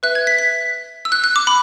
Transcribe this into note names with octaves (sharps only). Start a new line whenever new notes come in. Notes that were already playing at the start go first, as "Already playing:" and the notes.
B4 E5 F#6
G#6
B6
B6
E6
F#6
F#6
D6
B5